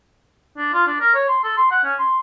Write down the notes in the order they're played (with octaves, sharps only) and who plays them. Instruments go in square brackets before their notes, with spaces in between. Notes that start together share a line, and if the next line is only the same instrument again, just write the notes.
[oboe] D4
F4
D4
A#4
C#5
C6
A4
C6
F#5
C#4
C6